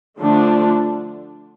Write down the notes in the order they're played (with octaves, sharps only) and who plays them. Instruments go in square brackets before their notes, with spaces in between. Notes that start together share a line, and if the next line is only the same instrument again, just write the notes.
[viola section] D3 F3 A3 D4